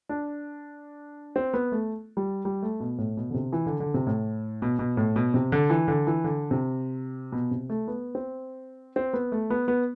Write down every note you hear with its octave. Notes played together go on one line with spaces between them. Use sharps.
D4
C4
B3
A3
G3
G3
A3
B2
A2
B2
D3
C3
E3
D3
D3
C3
A2
B2
B2
A2
B2
C3
D3
E3
D3
E3
D3
C3
B2
C3
A3
B3
C4
C4
B3
A3
B3
B3